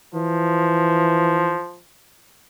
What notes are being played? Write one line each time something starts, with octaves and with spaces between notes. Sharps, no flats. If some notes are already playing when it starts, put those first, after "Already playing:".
E3 F3